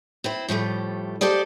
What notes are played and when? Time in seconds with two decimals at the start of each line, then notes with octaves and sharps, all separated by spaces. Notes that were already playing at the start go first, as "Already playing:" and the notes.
0.24 C4 E4 C5
0.49 A2 F3 G3 A3
1.21 G4 A4 C5 D5 D#5